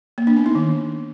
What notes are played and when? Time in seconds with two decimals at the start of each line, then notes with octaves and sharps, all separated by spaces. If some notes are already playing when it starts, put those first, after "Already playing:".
0.18 A#3
0.27 D4
0.36 B3
0.46 D#4
0.55 D#3